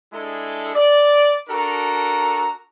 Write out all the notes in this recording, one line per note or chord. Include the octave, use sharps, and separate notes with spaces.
G#3 D4 E4 G#4 A4
D5
D4 F#4 A4 A#4 A#5